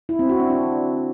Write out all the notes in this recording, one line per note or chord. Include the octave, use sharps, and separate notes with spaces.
E4
C4
F#4
D4
D4